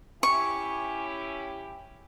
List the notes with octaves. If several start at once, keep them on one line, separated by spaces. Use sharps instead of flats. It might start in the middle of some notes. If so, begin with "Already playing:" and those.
C#4 E4 G4 C#6